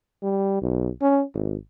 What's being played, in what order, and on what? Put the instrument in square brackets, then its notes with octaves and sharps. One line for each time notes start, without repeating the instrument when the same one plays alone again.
[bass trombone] G3
B1
C#4
G#1